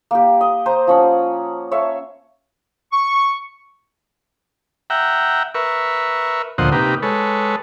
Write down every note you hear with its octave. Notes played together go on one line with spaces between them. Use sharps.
A#3 G4
D#5
C5 A#5
F3 C#4 F#5
C#5 E5 F5 C#6
C#6
E5 F#5 G5 A#5
A#4 B4 E5 C#6
D2 A#2 F3 C5 D#5 F#5
C3 A#3 D#4 G4 B4
G#3 A4 B4 C#5